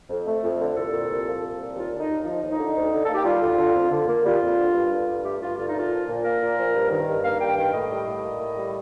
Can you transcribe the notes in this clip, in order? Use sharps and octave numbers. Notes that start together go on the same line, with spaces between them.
F2
A3
F2
D3
C2 A4
A#2
C2
F3
C2
A#2
D#2 F4
D3
D#4
D#2
F3 D#4
D#2
D#4
D3
D2
D3
A#3 A4
G4
G3 F4
D2
D3
F2
D3
A#3
G3 F4
F2
D3
G2
D3
G2
A3 G4
G2 F4
D3 F4
D#4
A#2
F4
F3
A#2
A#3 A#4
A#2
F3
G2
D#3
G2
A#3 F5
G2 G5
D#3 G5
A2 D#5
G3
A2
A#3
A2
G3